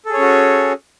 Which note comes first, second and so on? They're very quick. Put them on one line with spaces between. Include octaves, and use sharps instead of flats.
A4 G#4 C#5 C#4 F#4